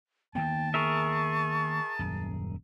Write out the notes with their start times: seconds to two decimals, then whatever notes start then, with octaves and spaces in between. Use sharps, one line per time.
0.35 D#3 A#3 B3 G5 A5
0.74 G#4 A#4 E5 C#6
1.99 D#1 F#2